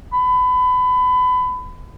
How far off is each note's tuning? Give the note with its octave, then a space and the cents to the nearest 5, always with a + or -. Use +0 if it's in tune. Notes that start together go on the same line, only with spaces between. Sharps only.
B5 +25